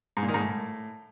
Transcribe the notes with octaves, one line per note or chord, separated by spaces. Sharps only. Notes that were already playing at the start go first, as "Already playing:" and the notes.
G#2
A#2
D#3
G#2
A2